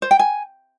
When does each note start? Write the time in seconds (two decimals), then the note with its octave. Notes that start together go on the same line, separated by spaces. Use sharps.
0.02 C5
0.11 G5
0.19 G#5